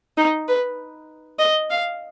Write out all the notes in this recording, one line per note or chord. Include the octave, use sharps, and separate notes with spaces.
D#4
B4
D#5
F5